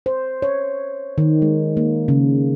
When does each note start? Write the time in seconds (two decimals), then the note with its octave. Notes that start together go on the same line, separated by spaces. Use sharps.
0.06 C5
0.42 C#5
1.18 D#3
1.42 G#3
1.77 A#3
2.08 C#3